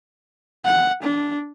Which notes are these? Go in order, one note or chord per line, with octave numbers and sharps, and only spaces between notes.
F#5
D4